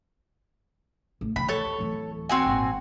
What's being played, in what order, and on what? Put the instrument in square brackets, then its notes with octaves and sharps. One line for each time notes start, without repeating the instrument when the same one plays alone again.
[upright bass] A1
[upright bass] E1 D#3 [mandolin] B5
[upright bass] D2 [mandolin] A4 C#5
[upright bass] D1 E3
[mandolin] C4 F#4 G#5
[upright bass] G#1 A#2